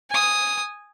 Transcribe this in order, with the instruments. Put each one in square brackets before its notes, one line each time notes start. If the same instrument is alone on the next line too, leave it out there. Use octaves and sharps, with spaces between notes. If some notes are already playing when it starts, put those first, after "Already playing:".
[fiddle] G#5 D#6